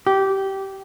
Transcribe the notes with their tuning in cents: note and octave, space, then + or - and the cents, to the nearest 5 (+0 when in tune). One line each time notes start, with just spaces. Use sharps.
G4 -15